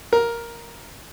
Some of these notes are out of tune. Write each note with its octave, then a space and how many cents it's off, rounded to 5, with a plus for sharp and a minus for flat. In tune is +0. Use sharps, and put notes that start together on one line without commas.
A#4 +5